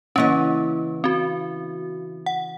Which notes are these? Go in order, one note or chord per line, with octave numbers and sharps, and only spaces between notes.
C#3 E3 A#3 C#4 D#5
C4 F#4
F#5